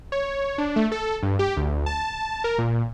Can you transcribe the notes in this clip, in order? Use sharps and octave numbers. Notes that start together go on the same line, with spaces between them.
C#5
D4
A3
A4
G2
G4
D2
A5
A#4
A#2